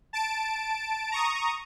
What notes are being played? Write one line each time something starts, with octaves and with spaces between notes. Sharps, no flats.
A5 D7
A#5 C#6 D#6